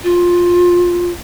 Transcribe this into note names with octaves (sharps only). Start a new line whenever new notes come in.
F4